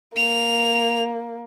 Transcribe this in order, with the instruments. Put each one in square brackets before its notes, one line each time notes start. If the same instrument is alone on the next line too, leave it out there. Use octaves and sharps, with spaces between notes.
[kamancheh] A#3 [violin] F7